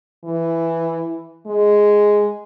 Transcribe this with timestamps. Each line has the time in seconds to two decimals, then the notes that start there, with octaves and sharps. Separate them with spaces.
0.24 E3
1.46 G#3